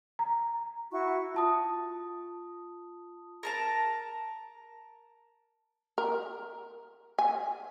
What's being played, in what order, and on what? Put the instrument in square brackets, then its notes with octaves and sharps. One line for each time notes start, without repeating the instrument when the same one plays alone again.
[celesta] A#5
[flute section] E4 F#4 C#6
[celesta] F4 A5 D#6
[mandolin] A#4 A5 A#5
[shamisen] A#4
G#5